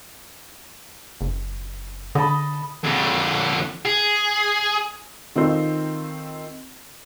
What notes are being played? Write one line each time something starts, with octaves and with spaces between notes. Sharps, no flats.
F#1
D3 D#5 A5 B5
F2 D3
G#4
D#3 C4 D#4 F4 A4 C5